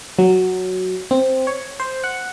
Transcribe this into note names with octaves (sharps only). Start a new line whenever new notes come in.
F#3
C4
C#5
C5
F#5